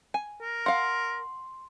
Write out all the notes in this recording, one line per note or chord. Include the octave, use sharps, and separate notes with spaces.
G#5
A#4
F5 F#5 C6